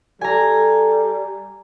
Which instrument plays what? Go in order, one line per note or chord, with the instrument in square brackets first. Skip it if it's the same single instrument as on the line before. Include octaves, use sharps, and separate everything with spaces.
[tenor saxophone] G3 [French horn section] A4 [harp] G#5 A#5